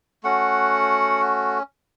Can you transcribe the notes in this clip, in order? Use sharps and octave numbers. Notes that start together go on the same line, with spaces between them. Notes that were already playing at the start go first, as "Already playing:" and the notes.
A3 C#4 F#4 F#5